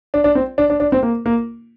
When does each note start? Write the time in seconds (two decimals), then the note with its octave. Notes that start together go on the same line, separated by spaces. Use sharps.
0.14 D4
0.24 D4
0.35 C4
0.58 D4
0.70 D4
0.80 D4
0.92 C4
1.03 A#3
1.26 A#3